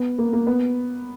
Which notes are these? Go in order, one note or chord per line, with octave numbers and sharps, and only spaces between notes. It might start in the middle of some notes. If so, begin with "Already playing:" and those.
Already playing: B3
A#3
A#3
B3